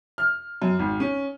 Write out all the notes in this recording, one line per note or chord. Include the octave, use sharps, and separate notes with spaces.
F6
F#2
G#1
C#4